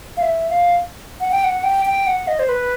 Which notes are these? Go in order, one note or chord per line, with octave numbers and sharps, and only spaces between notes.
F5
E5
F5
F#5
G5
F#5
G5
G5
F#5
D#5
C5
B4